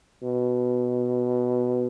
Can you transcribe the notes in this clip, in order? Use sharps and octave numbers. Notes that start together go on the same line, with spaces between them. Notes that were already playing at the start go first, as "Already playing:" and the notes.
B2